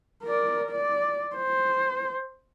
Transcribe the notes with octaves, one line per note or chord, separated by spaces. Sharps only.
A#4 D5
D5
C5